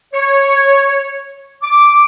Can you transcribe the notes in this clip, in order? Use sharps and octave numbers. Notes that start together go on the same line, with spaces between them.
C#5
D6